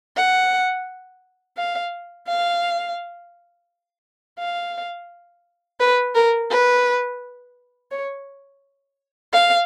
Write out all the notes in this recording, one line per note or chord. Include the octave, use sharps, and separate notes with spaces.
F#5
F5
F5
F5
B4
A#4
B4
C#5
F5